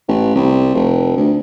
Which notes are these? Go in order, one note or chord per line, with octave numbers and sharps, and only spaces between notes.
A1
C2
F1
D2